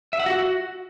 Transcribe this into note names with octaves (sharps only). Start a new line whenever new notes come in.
E5
F#5
F#4